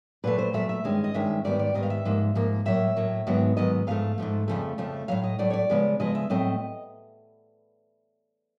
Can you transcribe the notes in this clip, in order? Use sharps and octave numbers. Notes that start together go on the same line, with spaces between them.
A#2 F#3 A3 B4
C5
A#2 F#3 A3 E5
E5
G2 D#3 G#3 C#4
D#5
G2 D#3 G#3 C#4 E5
G#2 D#3 G3 B3 D5
D5
G#2 D#3 G3 B3 D#5
F5
E5
G#2 F3 A#3
G#2 F3 A#3
A2 F#3 A#3 E5
A2 F#3 A#3
G#2 D#3 F#3 B3
G#2 D#3 F#3 B3 D#5
G#2 F3 A3 F5
G#2 F3 A3
F2 C#3 F3 A3
F2 C#3 F3 A3
A2 F#3 A3 F5
D#5
A2 F#3 A3 D5
C#5
D5
C#3 F3 G#3 B3
C#3 F3 G#3 B3 D#5
E5
A2 F#3 A3 C4 D#5